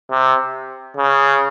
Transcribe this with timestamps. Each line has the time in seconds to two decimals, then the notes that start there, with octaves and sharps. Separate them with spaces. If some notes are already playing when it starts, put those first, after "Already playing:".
0.10 C3
0.97 C#3